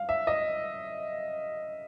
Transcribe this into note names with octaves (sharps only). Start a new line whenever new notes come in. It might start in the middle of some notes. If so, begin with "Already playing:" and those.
Already playing: F5
E5
D#5